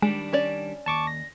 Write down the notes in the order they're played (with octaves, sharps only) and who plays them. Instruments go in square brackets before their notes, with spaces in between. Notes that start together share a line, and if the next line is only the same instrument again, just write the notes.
[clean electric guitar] D#3 G3 D4 [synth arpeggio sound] G#3
[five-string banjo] C#4 C#5 D5
[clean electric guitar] D#2 [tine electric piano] A5 C#6 D6
[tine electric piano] A#6